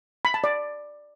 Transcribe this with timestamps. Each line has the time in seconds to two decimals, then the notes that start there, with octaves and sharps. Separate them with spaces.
0.25 B5
0.34 A5
0.44 D5